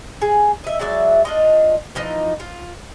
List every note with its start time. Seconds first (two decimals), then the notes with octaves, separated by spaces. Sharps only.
0.22 G#4
0.64 D#5 E5
0.79 F#3 G#3 D5 E5
1.25 D4 F4 D#5
1.95 E3 F3 D#4
2.40 F4